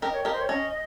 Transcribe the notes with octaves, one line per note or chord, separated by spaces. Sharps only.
G4 A#4 D#5
C#5
G4 A#4 D#5
C5
C#5
C#4 D#5